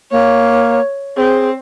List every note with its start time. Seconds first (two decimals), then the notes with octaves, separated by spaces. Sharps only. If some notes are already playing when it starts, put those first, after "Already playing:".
0.11 A#3 C#5
1.17 C4 G#4